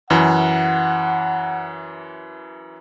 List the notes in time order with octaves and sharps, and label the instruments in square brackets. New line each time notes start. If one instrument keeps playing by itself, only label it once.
[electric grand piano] F#2 E3 [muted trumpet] F#5